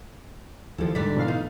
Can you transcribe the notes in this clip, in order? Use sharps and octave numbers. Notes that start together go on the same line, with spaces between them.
D#2 F3 E4 A4
G#2 D3 G3 D4 B6
B2 E3 F5
A3 D#4 F4